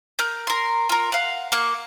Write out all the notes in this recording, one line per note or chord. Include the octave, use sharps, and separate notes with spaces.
A#4 G6
A#4 C6
F4 A#4
F5 F#5
A#3 C#6 F#6